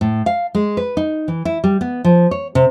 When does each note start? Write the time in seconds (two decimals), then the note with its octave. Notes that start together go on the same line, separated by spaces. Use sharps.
0.01 A2
0.26 F5
0.55 G#3
0.77 B4
0.97 D#4
1.28 E3
1.45 E4
1.64 G3
1.81 B3
2.05 F3
2.31 C#5
2.55 C3